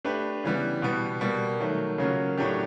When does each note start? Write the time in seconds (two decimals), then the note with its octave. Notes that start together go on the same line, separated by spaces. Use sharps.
0.05 A3 D4 G4 B4
0.44 C#3 E3 G3 B3
0.82 B2 G3 B3
1.21 B2 G3 A#3
1.60 D#3 F#3 A3
1.98 C#3 F#3 A#3 C#4 F4
2.37 A2 F#3 A3 D4 G4